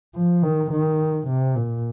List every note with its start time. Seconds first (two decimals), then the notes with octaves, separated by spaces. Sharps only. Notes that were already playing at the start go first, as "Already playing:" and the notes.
0.14 F3
0.42 D#3
0.71 D#3
1.28 C3
1.55 A#2